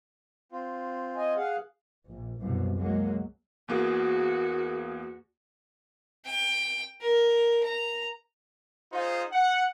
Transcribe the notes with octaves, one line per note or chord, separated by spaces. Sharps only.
C4 F4
D#5 G#5
G#4 F5 F#5
A#1
C2 F#2 B2
F#3 G#3 A#3
E2 A#3 F#4 G#4
G5
A#4
A#5
D#4 F4 G#4 C5
F#5